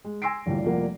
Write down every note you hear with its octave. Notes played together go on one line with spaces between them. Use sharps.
G#3
G#5 C6 E6 A#6 C7 D7
A1 D2 A#2 G3
F1 F3 G3 A#3 F#5